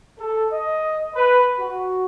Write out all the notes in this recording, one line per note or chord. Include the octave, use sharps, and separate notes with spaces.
A4
D#5
B4
F#4